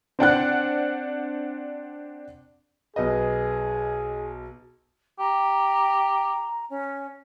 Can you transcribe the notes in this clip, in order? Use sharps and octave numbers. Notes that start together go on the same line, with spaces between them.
C4 D4 F#5 F#6
B1 G#4 B4 D#5
G4 A#5
C#4